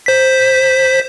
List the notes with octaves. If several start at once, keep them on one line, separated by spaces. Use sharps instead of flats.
C5 B6